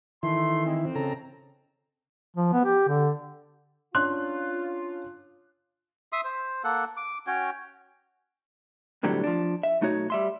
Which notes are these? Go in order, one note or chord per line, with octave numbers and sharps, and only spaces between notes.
D#3 E3 A3 E4 C6
G#3 C4
F2 C4
C#3 A4 A#5
F3
B3
G4
D3
C#4 D4 F4 C6 F#6
E5 C6 D#6
C5
A#3 A4 F#5
D6
C#4 F#4 C#5 G5
B1 A2 D3 F#3 G3 C4
F3 D4
E5
B1 A3 D#4 F#4 C#5
G3 E5 C6